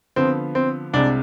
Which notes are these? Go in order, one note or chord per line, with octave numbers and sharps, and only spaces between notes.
D3 F3 B3 C4
C4
C2 C3 G#3 D4